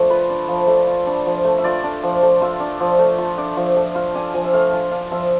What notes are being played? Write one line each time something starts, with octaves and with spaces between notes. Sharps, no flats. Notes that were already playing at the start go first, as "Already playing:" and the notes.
Already playing: F3 A3 D4 D5
F4 B4
D4
F3
A3
F4
D4
F3
A3
E5
F4 D5
D4
F3
A3
F4 E5
D4
F3
A3
F4
D4
F3
A3
F4 F5
D4 G#5
F3 G#5
E5
A3 F5
F4 G#5
D4 F5
F3 E5